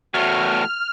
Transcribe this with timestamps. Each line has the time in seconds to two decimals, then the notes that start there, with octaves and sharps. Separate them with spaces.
0.14 E2 A2 F#4 F6